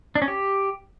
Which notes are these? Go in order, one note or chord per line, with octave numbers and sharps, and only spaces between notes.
D4
C#4
G4